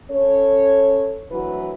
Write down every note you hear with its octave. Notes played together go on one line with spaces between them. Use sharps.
C#4 A4 C#5
D2 E3 F#3 F#4 B4